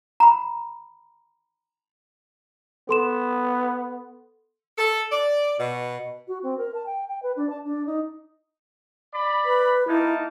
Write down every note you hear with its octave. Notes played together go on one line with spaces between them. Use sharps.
A#5 B5
B3 A4 C6 E7
A4
D5
B2
F#4
C4
A#4
A5
G5
G5
B4
D4
A5
D4
D#4
D5 B5
B4
A#3 D#4 E4 A5